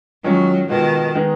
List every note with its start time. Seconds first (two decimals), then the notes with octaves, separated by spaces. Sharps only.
0.24 D#3 F#3 G#3 C#4 F4
0.69 B2 D#3 G#3 B3 F4
1.15 D#3 G#3 B3 D#4